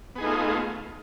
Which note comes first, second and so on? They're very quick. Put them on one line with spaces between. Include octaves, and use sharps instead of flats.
B3 G#4 D#4 A3 F4